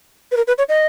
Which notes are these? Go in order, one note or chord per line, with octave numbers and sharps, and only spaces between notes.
B4
A#4
B4
C#5
D#5